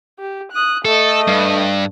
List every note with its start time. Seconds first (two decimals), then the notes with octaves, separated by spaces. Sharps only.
0.19 G4
0.52 D#6 F#6
0.85 A3 A4 D#5
1.28 G2